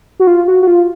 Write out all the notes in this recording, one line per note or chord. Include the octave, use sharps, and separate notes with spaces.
F#4
F4
F#4
F#4
F4